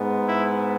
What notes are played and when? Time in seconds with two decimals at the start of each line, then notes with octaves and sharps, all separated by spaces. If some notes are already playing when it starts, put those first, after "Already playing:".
Already playing: G#2 G#3 B3
0.26 E4